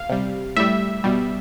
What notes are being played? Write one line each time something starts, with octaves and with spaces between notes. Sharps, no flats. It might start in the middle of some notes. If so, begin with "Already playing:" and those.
Already playing: F5
C3 G3
A2 G3 E5
B2 G3